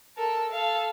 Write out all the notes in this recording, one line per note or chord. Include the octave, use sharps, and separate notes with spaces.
A4 A#4
A4 F5